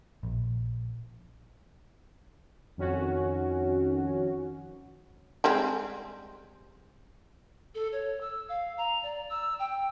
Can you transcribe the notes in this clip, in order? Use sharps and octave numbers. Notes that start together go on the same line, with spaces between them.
A#1
F2 D#3 C#4 F#4
G3 G#3 C4
A4
C#5
E6
F5
A#5
D5
E6
G5